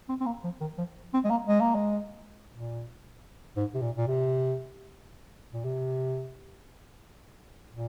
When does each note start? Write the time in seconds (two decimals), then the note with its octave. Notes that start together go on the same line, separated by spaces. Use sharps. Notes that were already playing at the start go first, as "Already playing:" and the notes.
0.09 C4
0.21 C4
0.26 A#3
0.44 F3
0.61 D#3
0.78 F3
1.14 C4
1.24 G#3
1.31 A#3
1.47 G#3
1.61 A#3
1.75 G#3
2.52 A#2
3.56 G#2
3.74 C3
3.82 A#2
3.97 A#2
4.08 C3
5.53 A#2
5.64 C3
7.72 A#2